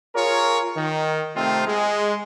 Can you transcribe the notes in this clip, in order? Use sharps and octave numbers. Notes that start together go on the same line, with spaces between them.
F4 G#4 A#4 C#5
D#3
C3 D#3 A3 C4 F4
G#3